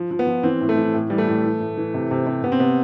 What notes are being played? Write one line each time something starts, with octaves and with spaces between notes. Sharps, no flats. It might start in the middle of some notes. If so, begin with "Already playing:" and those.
Already playing: F3
F3
B3
F3
E3 C4
A2
A3
E3
A2
E3 G3
A3
A2
E3
A2
E3
C3
C3
C3
C3 B3
C4
C3 B3